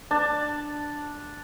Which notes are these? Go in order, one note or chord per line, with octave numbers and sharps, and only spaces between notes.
D4 A5